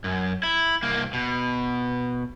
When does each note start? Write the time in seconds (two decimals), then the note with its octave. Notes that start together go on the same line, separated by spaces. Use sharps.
0.04 F#2
0.43 E4
0.83 C2 A#3
1.13 B2